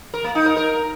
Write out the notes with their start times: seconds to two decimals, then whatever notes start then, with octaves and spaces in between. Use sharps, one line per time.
0.14 A#4
0.24 A#3
0.35 D#4
0.46 A#4
0.57 A#4